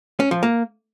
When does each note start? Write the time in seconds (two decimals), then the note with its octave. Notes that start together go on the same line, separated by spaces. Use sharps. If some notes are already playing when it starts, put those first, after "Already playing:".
0.20 C#4
0.31 F3
0.43 A#3